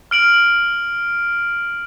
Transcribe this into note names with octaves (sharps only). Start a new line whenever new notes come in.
F6 D7 F#7